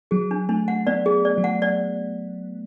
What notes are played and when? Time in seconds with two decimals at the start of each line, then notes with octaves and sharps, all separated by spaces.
0.11 F#3 G#4
0.31 D4
0.49 A3 D4
0.68 F#5
0.87 B3 D5
1.06 G#4
1.25 D5
1.38 F#3
1.44 F#5
1.62 D5